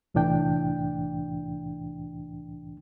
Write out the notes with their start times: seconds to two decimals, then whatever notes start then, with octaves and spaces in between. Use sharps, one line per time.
0.14 C2 A2 E3 D4 G5